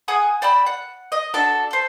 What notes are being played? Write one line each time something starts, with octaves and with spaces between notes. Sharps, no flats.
G#4 F#5 G#5 D#6
D5 G5 B5 E6
F#5
D#5
D4 F#4 A4 A5
A4 C5